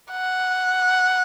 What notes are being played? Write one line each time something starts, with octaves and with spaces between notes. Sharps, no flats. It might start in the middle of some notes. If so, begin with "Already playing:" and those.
F#5